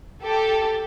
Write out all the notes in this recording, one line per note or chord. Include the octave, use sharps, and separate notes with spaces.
G4 A4